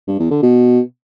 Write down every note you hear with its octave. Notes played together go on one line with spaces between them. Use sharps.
G2
E2
D3
B2